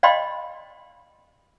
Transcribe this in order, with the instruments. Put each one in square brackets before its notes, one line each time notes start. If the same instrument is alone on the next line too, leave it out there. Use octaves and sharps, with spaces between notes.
[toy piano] D5 D#5 F5 G5 B5 C6